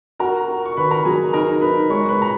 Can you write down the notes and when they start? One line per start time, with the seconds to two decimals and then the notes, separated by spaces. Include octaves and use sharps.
0.19 F#4 A#4 A#5
0.48 F#4
0.65 C#6
0.77 D#3 B4 B5
0.91 A#4 A#5
1.05 F#3 G#4 G#5
1.33 D#4 A#4 A#5
1.61 D#4 B4 B5
1.90 G#3 C#5 C#6
2.09 B4 B5
2.18 A#2 A#5